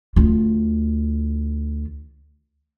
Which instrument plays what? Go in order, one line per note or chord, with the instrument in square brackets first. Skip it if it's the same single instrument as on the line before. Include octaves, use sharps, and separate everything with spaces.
[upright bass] D2 F4